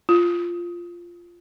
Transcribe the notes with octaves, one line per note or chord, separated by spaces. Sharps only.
F4